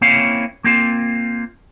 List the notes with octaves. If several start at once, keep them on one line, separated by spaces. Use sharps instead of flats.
A#3 C4 C#4 E4 C#5 F5
A#3 C4 F4